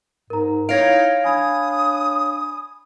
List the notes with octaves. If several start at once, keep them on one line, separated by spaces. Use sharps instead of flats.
G#2 A#4 A#5
D#4 E4 C#5 F5 G#6 A#6 D7
D4 G#5 B5 D#6 G#6